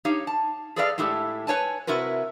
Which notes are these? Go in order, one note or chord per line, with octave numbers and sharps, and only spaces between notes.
D#4 G4 C#5 F5
A5
G#4 A4 B4 D5 D#5 F5
A2 G#3 E4 G4 A4
B4 C#5 G#5 A5
C3 E4 F#4 A#4 B4